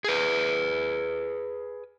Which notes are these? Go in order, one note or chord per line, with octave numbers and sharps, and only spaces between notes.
G#4 B4